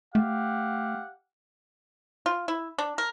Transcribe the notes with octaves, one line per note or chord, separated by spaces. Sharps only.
A3 G4 F5 F#5
F4
E4
D4
A#4